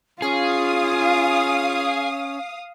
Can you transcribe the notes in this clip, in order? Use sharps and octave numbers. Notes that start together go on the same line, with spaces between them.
C#4 F4 G#4 F5 D#6